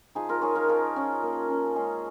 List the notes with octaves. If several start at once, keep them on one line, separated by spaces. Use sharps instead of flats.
F3 D#4 G#4
F4 A#4
D#4 G#4 C#5
F4 A#4
F3 F4 A#4
C#4
A#3
C#4
G#3 G#4 C#5